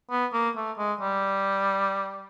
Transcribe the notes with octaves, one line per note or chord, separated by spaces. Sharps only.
B3
A#3
A3
G#3
G3